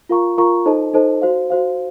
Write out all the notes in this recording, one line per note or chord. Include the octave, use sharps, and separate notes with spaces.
F4 A#4 F5 A#5 C#6
F4 A#4 F5 A#5 C#6
D#4 A4 C5 D#5 A5
D#4 A4 C5 D#5 A5
F#4 C5 F5
F#4 C5 F5